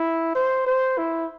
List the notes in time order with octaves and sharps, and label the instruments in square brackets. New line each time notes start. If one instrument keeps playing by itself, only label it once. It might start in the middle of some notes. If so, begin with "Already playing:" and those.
Already playing: [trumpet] E4
C5
C5
E4